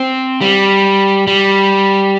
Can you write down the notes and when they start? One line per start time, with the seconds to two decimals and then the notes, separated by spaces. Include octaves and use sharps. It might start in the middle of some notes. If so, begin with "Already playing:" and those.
Already playing: C4
0.41 G3
1.27 G3